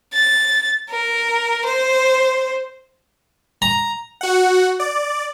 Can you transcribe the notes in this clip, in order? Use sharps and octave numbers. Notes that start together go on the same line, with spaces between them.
A6
A#4
C5
A#5
F#4 F#5
D5